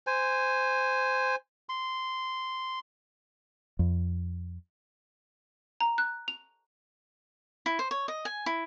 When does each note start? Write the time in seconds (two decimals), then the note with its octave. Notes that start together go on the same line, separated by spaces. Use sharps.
0.07 C5 G#5
1.69 C6
3.79 F2
5.80 A#5
5.98 F#6
6.28 F7
7.66 E4
7.79 C5
7.91 C#5
8.08 D#5
8.25 G#5
8.46 E4